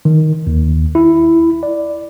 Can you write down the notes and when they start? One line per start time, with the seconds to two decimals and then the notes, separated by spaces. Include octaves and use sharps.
0.05 D#3
0.47 D#2
0.95 E4
1.63 D5